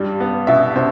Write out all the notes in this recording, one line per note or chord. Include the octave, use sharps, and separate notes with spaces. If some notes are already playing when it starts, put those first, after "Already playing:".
Already playing: G2 G3
B3
B2 E5
B2 C5